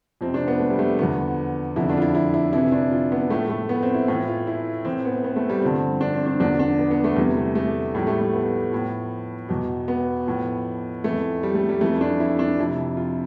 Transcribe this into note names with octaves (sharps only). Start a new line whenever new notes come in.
F2 C3 F3 C4
D4
B3
A3
G3
A3
E2 D3 F3 B3
F2 D3 F3 E4
D4
F4
E4
E4
E4
F2 C3 E3 E4
D4
F4
B3
A2 F3 A3
A3
B3
C4
E4
A2 E3 F4
F4
E4
A2 E3 C4
B3
B3
A3
G3
G2 D3 F3 C4
D4
C4
D4
E2 D3 F3 D4
D4
B3
B3
A3
E2 C3 E3 G3
A3
A3
A2 F3 G3
A3
A3
B3
A2 F3
E2 B2
B3
A2 F3
F2 E3 A3
G3
A3
G3
F2 E3 A3
D4
E4
D4
F2 C3 F3 E4
F4